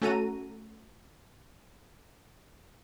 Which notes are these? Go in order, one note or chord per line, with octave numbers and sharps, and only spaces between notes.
A3 C#4 F#4 A4 A#5 D#7